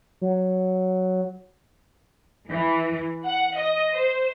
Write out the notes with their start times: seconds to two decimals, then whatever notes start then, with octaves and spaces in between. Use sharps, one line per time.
0.21 F#3
2.49 E3
3.26 F#5
3.58 D#5
3.95 C5